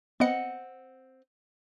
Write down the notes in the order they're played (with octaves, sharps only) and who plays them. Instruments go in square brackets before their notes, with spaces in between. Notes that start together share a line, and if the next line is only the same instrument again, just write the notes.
[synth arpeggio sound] B3 C#7 [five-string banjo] C4 D#5 F#5